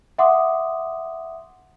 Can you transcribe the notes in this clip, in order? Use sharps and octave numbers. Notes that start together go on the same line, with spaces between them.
E5 F#5 C6 D6 D#6